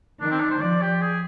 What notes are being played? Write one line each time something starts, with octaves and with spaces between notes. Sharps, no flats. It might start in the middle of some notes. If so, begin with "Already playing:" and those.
D#3 D4
C4
D4
C5
F3 D5
G4
G#4